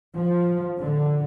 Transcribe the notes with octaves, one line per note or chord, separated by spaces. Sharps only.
F3
D3